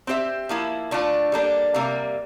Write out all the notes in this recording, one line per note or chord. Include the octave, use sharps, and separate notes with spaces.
C4 G4 C5 E5
F3 A#3 E4
D3 A3 D4 F4
G3 A#3 D4 A4
C3 G3 A#3